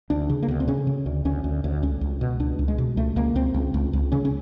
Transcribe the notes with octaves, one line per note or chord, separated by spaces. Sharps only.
D2 D4
C#3
A#3
D2 B3
C4
C#3 C#4
C#3
D2
D2 C#4
D2
D2
C#2 C#4
C#2
B2
C#2 D4
C#2
G#3
B2
C#2 A3
C#2 A#3
C#2 C4
C#2
C#2
C#2
C#3 C#4
C#4